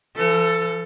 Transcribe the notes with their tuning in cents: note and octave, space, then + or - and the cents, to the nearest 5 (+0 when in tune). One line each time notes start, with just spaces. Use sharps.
F3 -45 A4 +10